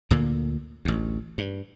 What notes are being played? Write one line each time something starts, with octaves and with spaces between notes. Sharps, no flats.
D2 A#2 D3 A#3
A1 D2
G2